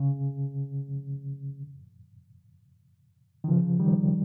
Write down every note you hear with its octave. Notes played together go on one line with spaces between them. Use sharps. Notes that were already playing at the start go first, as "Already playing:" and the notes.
Already playing: C#3
D#3
C#3 F3
D#3 G3